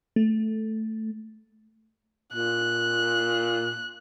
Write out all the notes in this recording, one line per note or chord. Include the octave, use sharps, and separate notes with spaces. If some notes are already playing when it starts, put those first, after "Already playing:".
A3
A#2 F#6